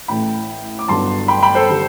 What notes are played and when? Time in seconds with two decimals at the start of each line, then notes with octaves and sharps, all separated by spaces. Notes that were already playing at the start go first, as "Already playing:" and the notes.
0.08 A1 A2 E3 A3 G5 B5
0.79 D6
0.88 G1 G2 F#3 B3 A5 C6
1.28 G5 B5
1.42 G5 B5
1.55 A4 C5
1.69 D3 G3